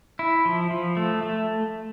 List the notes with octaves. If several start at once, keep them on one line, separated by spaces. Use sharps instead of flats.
E4
F3
F3
A3
A3